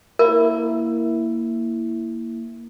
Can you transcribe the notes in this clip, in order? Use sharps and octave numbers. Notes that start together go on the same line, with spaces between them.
A#3 E4 A#4